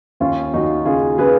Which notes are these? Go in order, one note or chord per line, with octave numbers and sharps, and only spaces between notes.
D#2 C#4 F4
D#2 D#4 F#4
C#3 F4 G#4
C#3 G#4 B4